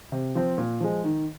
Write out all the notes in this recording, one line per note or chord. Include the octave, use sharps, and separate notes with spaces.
C3
F3 C4
A#2
F3 G#3
D#3